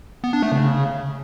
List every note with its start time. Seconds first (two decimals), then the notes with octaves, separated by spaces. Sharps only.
0.24 B3
0.33 D4
0.42 A3
0.52 C#3